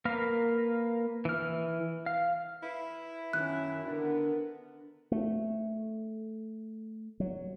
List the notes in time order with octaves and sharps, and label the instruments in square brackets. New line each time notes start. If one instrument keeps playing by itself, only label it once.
[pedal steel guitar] A#3 A#4 B4 F5
E3 F6
F5
[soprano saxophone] E4 [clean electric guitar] B4
[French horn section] F#2 [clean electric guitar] D#3 C#4 [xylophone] F#6
[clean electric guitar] D3 D4 [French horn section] B3 A#4
[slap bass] A3
F#3